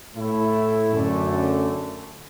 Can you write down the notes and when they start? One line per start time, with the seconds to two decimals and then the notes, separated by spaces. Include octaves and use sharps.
0.15 A2 A3 E4
0.92 F#2 D3 A3